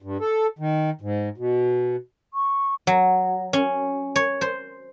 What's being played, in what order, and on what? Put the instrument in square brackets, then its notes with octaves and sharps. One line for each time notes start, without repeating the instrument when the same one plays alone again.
[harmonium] G2
A4
D#3
G#2
B2
[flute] C#6
[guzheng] F#3
C#4
C#5
C5